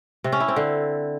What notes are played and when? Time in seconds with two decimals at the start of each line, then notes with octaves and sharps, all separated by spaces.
0.24 C3
0.32 C#4
0.40 E4
0.48 C4
0.56 D3